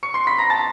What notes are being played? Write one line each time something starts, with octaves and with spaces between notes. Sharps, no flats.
C#6 C#7
C6 C7
B5 B6
A#5 A#6
A5 A6